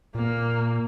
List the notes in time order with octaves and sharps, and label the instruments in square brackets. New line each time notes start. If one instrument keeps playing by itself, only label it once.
[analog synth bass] A#2 [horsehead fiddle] A#3